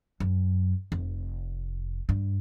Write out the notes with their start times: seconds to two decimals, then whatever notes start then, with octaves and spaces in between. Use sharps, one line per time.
0.20 F#2
0.92 F1
2.09 G2